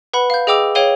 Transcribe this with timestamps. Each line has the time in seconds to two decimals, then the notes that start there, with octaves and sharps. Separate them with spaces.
0.14 B4 F#5 B5
0.30 F5 G6
0.47 G#4 D#5 G5 D6 E6 F7
0.75 G#4 C#5 F5 G5 D#7 G7